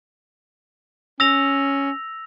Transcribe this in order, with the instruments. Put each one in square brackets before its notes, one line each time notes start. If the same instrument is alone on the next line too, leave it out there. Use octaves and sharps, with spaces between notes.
[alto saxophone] C#4 [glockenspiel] E6 A#6 F7